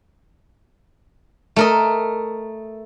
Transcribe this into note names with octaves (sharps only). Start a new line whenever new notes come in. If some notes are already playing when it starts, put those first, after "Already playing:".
A3 A#4 D#5